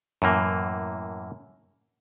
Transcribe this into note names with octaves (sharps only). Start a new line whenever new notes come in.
F#2 A2 E3 A#3